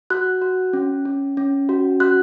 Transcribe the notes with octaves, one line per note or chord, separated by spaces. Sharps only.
F#4 F#6
F#4
C#4
C#4
C#4
F#4
F#4 F#6